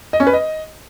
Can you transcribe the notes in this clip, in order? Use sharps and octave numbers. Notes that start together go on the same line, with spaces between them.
D#5
C#4
B4
D#5